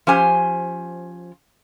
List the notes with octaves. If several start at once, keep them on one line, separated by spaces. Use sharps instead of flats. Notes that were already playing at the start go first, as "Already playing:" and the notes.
F3 C#4 G4 C5 G#5